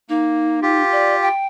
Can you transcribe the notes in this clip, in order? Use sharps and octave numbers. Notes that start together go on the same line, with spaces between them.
A#3 D#4
F4 G4
D5
G5